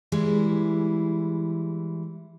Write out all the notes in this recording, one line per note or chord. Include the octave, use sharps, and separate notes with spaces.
E3 G3 G#3 E4